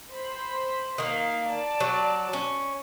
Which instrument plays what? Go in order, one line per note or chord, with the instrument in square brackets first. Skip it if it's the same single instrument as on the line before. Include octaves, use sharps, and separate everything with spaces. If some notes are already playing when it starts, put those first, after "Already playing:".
[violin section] C5 B5
[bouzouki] D#3 A#3 [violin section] F5
[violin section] D5 A5
[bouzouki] F#3
C#4